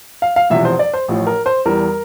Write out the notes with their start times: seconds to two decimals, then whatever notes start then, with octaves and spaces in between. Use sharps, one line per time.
0.22 F5
0.36 F5
0.50 E1 E2 C3 F3 E5
0.65 C5
0.79 D5
0.93 C5
1.08 A1 A2 F3
1.27 A#4
1.46 C5
1.65 E2 E3 G3 A#4